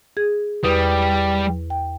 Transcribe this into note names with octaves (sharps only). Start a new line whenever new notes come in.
G#4 G#6
E2 G3 B4 D#6
G5